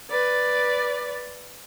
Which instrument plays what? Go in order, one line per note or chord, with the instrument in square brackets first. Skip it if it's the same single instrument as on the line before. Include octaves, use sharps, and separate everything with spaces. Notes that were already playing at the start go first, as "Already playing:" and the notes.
[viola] B4 D5